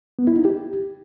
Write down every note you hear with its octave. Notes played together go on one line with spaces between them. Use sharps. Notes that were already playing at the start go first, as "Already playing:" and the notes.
B3
E4
D#4
G4